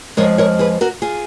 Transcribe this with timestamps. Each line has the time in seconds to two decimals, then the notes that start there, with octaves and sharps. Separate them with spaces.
0.17 F2 F3 G#3 A#4 C#5
0.38 A#4 C#5
0.59 G#4 B4
0.81 F#4 A#4
1.02 F4 G#4